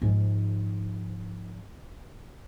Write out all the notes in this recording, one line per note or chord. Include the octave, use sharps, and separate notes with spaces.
G#2 F3